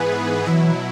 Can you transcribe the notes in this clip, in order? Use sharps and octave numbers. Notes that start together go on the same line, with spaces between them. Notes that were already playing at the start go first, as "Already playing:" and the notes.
Already playing: G#2 E3 B3 G#4 B4
B2 E3 F#3 E4